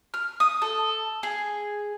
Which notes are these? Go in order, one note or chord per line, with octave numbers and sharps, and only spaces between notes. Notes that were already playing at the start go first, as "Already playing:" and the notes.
F6
D#6
A4
G#4